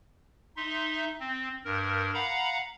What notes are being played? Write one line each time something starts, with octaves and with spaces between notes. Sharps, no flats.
D#4 E5 C6
C4
G2 A#4
F5 F#5 A#5 B5